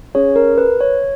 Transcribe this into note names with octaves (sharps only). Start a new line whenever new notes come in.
C#4 G#4 C#5
A#4
B4
C#5